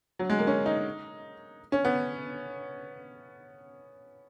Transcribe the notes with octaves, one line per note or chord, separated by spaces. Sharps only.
F#3
G#3
A#3
C#4
D#4
C#4
B3